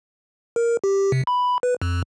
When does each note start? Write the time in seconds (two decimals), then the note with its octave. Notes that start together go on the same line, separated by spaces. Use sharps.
0.56 A#4
0.84 G4
1.12 C3
1.27 B5
1.63 B4
1.82 F2